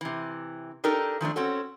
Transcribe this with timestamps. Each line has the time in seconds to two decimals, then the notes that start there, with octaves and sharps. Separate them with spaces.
0.01 C3 E3
0.84 D4 D#4 G4 A4 A#4
1.21 D#3 F3 A3 D4
1.36 C4 C#4 F#4 A4